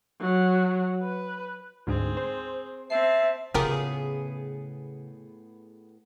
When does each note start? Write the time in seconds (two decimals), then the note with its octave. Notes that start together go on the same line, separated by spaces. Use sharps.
0.21 F#3
1.03 B4
1.87 D2 G#2 C4 G#4
2.17 C5
2.90 C4 E5 A5 C7
3.54 A2 C#3 B3 F4 G4 G#4 A#4